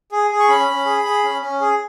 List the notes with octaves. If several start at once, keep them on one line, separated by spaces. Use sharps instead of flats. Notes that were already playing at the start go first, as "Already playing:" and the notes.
G#4
G#4
C#6
C#4 B5
C#4
G#4
G#4
C#4
C#4
G#4